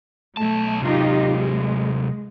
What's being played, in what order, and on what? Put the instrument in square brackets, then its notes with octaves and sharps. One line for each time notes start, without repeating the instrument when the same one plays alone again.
[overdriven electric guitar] B1 A5 [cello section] A3
[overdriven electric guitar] C3 F#3 [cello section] D#4 F4 G4
[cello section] G#3